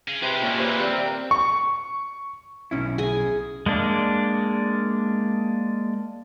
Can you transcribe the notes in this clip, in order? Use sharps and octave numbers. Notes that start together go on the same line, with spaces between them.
C#4 G#4
C3 F3 G#3 G4 B4 C5
A#2 C#4
B4 C5 E5 F5
G3 C4
A#4
C#6
B1 C#4 E4
G#4 G#5
G#3 A#3 D4